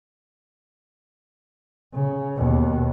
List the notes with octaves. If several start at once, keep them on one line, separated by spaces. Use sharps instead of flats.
C#3
D#2 B2